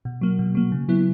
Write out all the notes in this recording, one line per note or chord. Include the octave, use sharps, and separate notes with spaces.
B2
F#3 A#3
B2
F#3 A#3
C#3
F#3 B3 E4